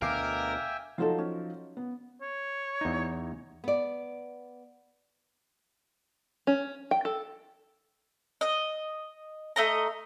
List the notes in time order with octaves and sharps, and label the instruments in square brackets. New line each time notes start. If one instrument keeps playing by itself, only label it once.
[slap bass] D2 B2 [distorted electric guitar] A#4 [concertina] E5 G5 G#5 [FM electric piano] F5 D6
[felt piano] F3 F#3 D#4 [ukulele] A4 C5 F5
[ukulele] C#4
[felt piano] B3
[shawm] C#5
[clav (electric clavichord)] E2 D#4
[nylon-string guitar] B3 D5
[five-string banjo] C#4
G5
A4
[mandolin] D#5
A3 D#5 A#5